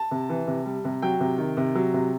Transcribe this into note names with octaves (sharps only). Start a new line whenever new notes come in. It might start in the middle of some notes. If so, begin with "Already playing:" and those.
Already playing: A5
C3
E3
C3
G3
C3
F#3 G5
C3
D#3
C3
F#3
C3